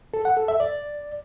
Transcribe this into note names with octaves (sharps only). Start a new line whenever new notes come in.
A4
F#5
A4
E5
D5